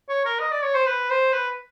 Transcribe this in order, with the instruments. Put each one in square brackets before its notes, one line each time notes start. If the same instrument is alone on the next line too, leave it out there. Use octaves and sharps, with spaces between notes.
[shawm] C#5
A#4
D#5
D5
C#5
C5
B4
C5
B4